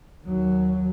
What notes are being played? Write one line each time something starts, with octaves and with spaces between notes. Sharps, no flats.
D#2 F#3